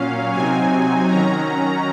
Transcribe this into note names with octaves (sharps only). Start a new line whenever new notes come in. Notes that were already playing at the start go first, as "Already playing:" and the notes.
Already playing: A#2 F#3 C#4 F5
C3 F#3 C4 D#4 G#5
D#3 F#3 C#4 A#5